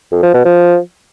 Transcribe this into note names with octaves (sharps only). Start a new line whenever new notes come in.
F2
F3
B2
F3